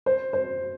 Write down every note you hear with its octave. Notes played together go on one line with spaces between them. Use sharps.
C5
C5